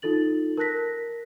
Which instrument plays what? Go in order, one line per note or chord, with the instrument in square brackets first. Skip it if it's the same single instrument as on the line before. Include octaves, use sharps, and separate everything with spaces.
[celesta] D#4 F4 A4 A6 F#7
A#4 A5 F#6 A#6 B6